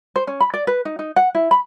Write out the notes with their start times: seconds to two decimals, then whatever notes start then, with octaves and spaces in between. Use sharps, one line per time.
0.16 C5
0.27 C#4
0.40 B5
0.54 D5
0.67 B4
0.85 D#4
0.99 D#4
1.16 F#5
1.35 E4
1.51 B5